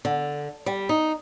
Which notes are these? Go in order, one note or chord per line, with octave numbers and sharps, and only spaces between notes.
D3
G3
D#4